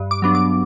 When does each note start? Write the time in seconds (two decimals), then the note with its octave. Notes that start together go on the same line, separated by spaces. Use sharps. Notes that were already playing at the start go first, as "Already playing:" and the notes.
Already playing: G2
0.11 D6
0.22 F#3 B3 D4
0.35 D6